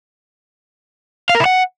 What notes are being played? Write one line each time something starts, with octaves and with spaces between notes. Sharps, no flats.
F5
A#4
E4
F#5